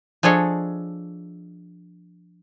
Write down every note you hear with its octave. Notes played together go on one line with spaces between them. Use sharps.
F3 D4 G#4 A4 C#5 D#5